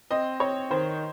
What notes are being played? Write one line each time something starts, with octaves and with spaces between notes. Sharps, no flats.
C4 D#5
C4 C#5
D#3 C5